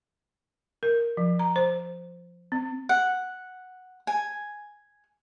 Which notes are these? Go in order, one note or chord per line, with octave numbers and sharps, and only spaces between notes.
A#4
F3
A#5
C5
C4
F#5
G#5